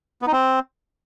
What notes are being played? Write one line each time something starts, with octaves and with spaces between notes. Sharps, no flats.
B3
D#4
C4